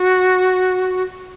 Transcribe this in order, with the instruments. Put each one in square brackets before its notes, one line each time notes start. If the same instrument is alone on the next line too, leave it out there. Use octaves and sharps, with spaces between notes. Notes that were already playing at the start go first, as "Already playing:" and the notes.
Already playing: [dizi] F#4